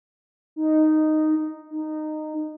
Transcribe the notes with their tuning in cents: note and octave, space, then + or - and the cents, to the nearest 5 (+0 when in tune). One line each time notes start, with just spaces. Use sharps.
D#4 -5
D#4 -15